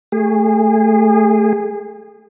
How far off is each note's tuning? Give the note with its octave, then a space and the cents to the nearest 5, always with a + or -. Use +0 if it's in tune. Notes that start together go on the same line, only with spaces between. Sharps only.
A3 +0 G#4 -30